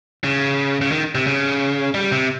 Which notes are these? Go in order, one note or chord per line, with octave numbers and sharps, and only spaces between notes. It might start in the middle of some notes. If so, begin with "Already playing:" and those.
C#3
C#3
D#3
C3
C#3
G3
C3